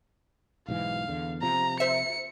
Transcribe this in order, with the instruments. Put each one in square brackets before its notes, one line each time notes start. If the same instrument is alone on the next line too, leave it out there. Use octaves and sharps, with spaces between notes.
[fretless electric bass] B1 G#2 E3 [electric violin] F5
[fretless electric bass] E2 D3
[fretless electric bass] C3 F3 [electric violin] A#5
[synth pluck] C5 E5 [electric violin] C#7